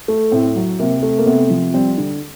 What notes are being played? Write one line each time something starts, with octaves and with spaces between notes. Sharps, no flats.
A3
A2 C4
F#3
C3 A#3
A3
A#3
C3 B3
F3
G3 C4
D3